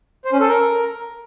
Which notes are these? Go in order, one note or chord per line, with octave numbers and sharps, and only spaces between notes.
C5
C#4
A4
A#4